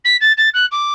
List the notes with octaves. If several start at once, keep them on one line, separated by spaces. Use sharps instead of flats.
B6
A6
A6
F#6
D6